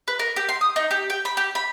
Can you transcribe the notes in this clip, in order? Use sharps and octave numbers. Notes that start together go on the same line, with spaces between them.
B4
A#4
G4
C6
D#6
D#4
G4
G5
B5
G4
B5